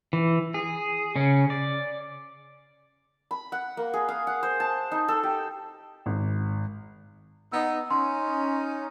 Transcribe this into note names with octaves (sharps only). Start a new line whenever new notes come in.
E3
G#4
C#3 C#4
D5
B5
F#5
A#3
G#4
F5
F#5
C5
A5
D#4
A4
G4
G#1
B3 D#4 E6
C#4 D#4 C6